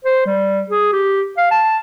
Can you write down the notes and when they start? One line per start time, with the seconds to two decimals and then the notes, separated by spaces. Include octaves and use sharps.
0.05 C5
0.26 G3
0.70 G#4
0.93 G4
1.37 F5
1.51 A5